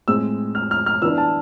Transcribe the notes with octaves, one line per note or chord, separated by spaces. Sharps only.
A2 G#3 C4 E6
F6
F6
F6
E3 B3 D4 E6
A5